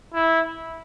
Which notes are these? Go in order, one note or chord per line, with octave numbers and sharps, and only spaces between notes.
E4